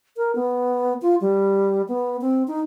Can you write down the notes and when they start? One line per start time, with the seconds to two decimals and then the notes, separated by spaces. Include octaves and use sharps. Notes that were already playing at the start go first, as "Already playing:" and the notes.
0.17 A#4
0.35 B3
1.02 F4
1.21 G3
1.88 B3
2.21 C4
2.48 D#4